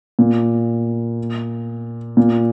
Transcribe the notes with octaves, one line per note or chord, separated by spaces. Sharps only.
A#2
A#2